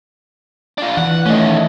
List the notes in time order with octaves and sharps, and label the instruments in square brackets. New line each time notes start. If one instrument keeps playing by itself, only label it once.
[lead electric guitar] D4 F4
[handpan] E3 [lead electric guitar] F#5
[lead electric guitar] D#3 C#4 [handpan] A3 D#5